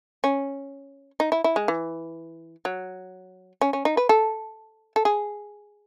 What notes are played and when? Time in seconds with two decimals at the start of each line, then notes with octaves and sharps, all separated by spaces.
0.24 C#4
1.20 D#4
1.32 E4
1.44 E4
1.56 G#3
1.68 E3
2.65 F#3
3.61 C#4
3.73 C#4
3.85 D#4
3.97 B4
4.09 A4
4.96 A4
5.05 G#4